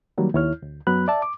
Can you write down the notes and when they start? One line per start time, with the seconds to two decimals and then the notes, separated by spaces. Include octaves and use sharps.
0.18 D#3 F#3 G3 A#3
0.34 D#2 E4 C#5 F6
0.62 D2
0.87 F#2 F#3 B3 B5 F#6
1.08 D5 E5 A5
1.22 D6